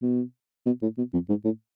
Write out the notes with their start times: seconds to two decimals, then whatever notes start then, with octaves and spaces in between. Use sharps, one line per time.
0.02 B2
0.66 B2
0.82 A2
0.98 B2
1.13 F2
1.29 G#2
1.45 A2